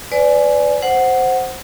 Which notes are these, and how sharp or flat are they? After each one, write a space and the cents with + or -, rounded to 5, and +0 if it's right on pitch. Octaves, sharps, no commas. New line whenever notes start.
B4 +30 D5 -15 G#5 +15
C5 +0 F#5 +0